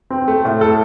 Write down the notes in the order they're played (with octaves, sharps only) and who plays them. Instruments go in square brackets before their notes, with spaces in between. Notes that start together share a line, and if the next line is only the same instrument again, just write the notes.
[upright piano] C4
A3
A2
A4